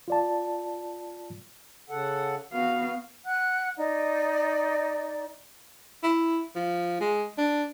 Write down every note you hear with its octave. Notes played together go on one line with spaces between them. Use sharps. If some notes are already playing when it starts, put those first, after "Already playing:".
F4 D5 A5
C#3 A4 F#5
B3 F#4 F5
F#5 F#6
D#4 D5
E4
F3
G#3
D4